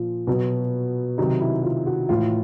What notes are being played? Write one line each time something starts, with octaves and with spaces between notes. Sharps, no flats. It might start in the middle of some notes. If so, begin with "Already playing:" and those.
Already playing: A#2 F3
B2 F#3
C3 D#3 F#3 D#4
E4
F4
F#4
A2 E3 F4